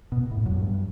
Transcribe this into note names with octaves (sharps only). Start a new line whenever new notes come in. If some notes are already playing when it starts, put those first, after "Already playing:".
B2
A2
F#2
G2